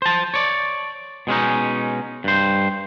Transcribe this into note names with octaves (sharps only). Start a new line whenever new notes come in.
C5 A5
C#5 D5
B2 G#3 C#4 D#4
G2 C5